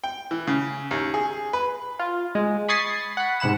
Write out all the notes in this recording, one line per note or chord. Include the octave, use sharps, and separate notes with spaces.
G5
E3
C#3
D#2
G#4
B4
F4
G#3
B5 C#6 D#6 G#6 A6 C7
F#5 B5
G#2 C3 F#5 B5 E7